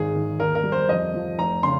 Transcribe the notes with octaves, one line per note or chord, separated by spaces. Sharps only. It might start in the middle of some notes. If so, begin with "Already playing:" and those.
Already playing: G#1 D#3 G#4
D#3
D#2 A#4
A#4
G3
C5
F2 D#5
F3
F1 A#5
C#3 C6